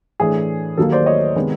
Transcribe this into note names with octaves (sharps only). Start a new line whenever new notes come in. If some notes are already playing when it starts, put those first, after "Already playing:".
A2 E3 A3 D4 G#4
D#2 D#3 F#3 A#3 A4
C5 D5
C#5 D#5
C3 D#3 G#3 B3